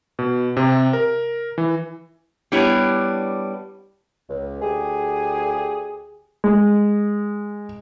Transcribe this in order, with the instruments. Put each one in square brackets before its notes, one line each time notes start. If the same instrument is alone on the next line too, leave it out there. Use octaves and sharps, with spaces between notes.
[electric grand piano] B2
C3
A#4
E3
[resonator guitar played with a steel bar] G3 B3 D4 E4 C#5
[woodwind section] C#2
D2 G4 G#4
[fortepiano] G#3